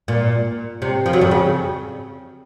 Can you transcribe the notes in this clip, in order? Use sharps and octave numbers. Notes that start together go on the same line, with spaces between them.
A#2
C3
F3
F#3
F2 F3
C#3